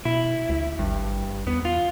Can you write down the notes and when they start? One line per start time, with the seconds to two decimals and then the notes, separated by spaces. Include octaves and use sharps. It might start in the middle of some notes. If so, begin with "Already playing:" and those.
0.05 B2 E4
0.49 D2
0.79 G#1 G2
1.47 E2 B3
1.65 F4